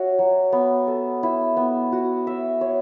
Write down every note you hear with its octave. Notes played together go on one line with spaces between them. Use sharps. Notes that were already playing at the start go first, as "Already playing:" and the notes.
Already playing: F#4 C#5 E5
F#3
B3
A4
E4
B3
F#4
E5
C#5